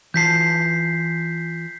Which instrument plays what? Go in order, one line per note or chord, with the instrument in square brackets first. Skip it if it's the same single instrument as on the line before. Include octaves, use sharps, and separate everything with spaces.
[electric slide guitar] E3 F4 A5 [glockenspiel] G6 B6 C7